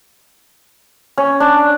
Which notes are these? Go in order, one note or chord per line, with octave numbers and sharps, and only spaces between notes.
C#4
D4